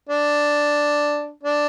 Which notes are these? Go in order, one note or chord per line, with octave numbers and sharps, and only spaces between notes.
D4
D4